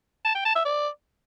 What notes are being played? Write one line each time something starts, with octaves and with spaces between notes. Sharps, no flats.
A5
G5
A5
E5
D5